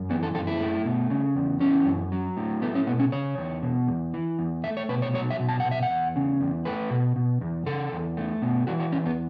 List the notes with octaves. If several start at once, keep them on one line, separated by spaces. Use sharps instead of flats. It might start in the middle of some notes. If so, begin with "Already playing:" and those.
Already playing: F#2
E3 B3
A4
F#2 A4
E4
A3
B2
C#3
E2
E3 C#4
F#2
F#3
A2
A3 B3
C#4
B2 B3
C#4
C#3 C#5
E2
B2
E2
E3
E2
A3 E5
C#5
B2 B4
C#5
F#3 C#5
E5
B2
A5
F#5
B2
E5
F#5
E2
C#3
E2
A3 B4
B2
B2
E2
C#3 A4
E2
A3
B2
E3 F#4
F#4
E2 C#4
B3